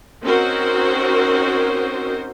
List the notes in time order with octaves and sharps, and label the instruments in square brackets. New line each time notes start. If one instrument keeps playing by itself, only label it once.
[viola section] C4 C#4 D#4 F#4 A#4 C5